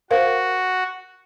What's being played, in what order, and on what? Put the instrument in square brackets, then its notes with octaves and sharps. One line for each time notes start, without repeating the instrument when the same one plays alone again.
[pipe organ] F#4 [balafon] A#4 C5 F5